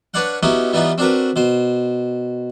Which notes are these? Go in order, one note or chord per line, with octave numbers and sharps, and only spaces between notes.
D4 B4 C#5 D5 F5 F#5
B3 C#4 D#4 E4 F#4 G4
E3 G3 B3 D#4 F4
C4 D4 F#4 A#4 B4
B2 C5